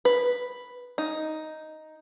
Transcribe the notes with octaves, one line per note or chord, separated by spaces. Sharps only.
B4
D#4